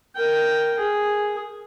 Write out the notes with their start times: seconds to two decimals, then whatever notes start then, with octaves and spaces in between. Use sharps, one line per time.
0.16 A#4 G5
0.78 G#4